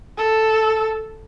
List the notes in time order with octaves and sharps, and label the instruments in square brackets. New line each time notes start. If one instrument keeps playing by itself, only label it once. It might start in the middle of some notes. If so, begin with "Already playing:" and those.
[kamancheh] A4